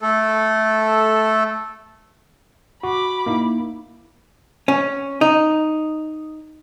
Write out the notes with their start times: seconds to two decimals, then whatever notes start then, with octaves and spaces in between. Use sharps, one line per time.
0.01 A3 A4
2.83 F#4 B5 D6
3.26 A#3 D#4 E4
4.68 C#4
5.21 D#4